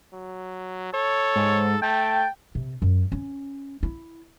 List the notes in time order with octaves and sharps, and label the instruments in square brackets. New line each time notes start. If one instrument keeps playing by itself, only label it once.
[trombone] F#3
[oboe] A4 [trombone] C#5
[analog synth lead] G#2
[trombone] A3 [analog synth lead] G5 [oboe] A5
[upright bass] C3
F#2
C#4
E4